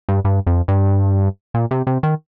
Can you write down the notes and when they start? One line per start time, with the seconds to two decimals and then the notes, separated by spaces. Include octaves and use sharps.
0.09 G2
0.25 G2
0.47 F2
0.68 G2
1.54 A#2
1.71 C3
1.87 C3
2.03 D#3